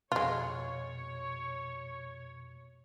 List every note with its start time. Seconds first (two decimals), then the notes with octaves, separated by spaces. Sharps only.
0.12 F2 B2 G#3 F4 C#5